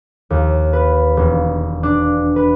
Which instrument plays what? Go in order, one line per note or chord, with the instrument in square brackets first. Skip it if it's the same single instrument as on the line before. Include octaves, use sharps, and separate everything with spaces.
[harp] D#2
B4
E1
D4
B4